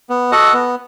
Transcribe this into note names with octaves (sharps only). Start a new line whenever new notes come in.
B3
F#4 A4 D#5 F#5
B3